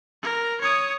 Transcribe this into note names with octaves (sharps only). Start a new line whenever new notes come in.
A#4
C#5 D#6